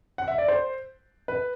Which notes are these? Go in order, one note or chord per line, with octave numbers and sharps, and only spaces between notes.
F#5
E5
D5
C5
B4